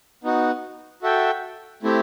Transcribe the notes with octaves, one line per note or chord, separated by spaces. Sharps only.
B3 D#4 F#4
F#4 A4 E5 G5
A3 C4 E4 G4